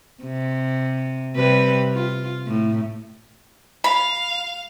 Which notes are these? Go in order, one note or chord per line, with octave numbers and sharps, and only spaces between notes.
C3
C3 G3 B4
F4
A2
F5 B5